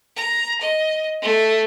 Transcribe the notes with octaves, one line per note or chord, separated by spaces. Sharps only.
A#5
D#5
A3